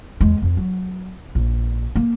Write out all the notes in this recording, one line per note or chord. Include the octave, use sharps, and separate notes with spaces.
E2 G#3
F2
F#3
A#1
A#3